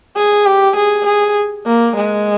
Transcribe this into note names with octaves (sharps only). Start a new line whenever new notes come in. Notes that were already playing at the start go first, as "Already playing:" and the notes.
G#4
G4
G#4
G#4
A#3
G#3